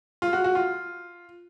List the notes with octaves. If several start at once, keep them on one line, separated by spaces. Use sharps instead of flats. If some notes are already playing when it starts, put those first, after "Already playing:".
F4
F#4
F#4
F4